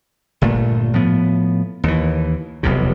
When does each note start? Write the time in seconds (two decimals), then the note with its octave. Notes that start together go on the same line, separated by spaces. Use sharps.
0.42 G1 A#2 A3
0.93 A2 F3 B3
1.84 D#2 E3
2.63 F1 B1 E2 C3